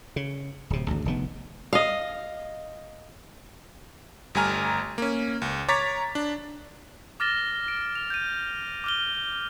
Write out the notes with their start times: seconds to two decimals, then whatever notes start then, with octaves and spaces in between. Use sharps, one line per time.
0.16 C#3
0.70 D1 C3
0.88 G#1 D2
1.06 F1 D#3 B3
1.73 D#5 F5
4.35 G1 G3 A3 G#5 A#5 F6
4.98 A#3 C#4
5.42 C#2
5.69 C#5 A#5 D6 A6 B6
6.15 D4
7.20 D6 F6 A6 A#6 E7 G7
7.68 D7
7.95 F7
8.10 G6 D#7
8.84 D6 F6 G7